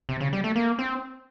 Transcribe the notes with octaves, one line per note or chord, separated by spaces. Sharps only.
C3
C#3
G3
A3
A#3
C4